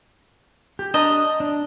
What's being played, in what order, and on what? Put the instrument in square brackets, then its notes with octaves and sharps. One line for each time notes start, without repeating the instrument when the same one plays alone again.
[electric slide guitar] G4
[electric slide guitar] D4 [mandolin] D#5 A#5 D#6
[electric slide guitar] D4